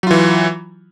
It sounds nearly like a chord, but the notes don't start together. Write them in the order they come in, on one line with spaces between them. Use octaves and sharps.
F#3 F4 E3